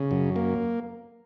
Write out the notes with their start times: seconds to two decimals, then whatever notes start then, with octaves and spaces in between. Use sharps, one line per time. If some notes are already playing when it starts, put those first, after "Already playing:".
Already playing: C#3
0.11 F#2
0.36 A#3